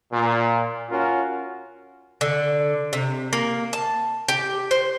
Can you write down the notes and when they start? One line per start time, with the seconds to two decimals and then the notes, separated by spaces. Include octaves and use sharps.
0.12 A#2
0.91 C#4 F4 F#4 A#4
2.21 D3
2.93 C3
3.33 A#3
3.73 A5
4.28 G4
4.71 C5